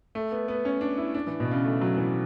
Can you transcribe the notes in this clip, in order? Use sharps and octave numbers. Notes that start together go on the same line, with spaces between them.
A3
B3
B3
C#4
D4
E4
D4
E3
B2
C#3
A3
F#3
E3